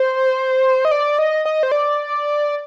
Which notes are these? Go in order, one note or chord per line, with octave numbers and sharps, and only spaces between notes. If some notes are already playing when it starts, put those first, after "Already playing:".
Already playing: C5
D#5
D5
D#5
D#5
C5
D5